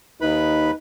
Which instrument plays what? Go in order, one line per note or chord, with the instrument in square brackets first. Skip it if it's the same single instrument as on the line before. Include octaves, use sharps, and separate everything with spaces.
[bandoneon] D#2 B4 B5 [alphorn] D#4